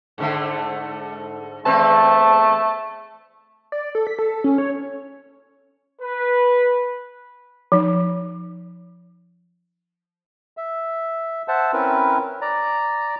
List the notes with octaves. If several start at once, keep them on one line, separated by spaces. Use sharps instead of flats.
G#2 D3 A3
E2 A3 C4 B4 A5
D5
A4
B6
A4
C#4
C#5
B4
F3 D#4
E5
C5 E5 F#5 A5
C4 C#4 E4 A#4 B4
D5 A#5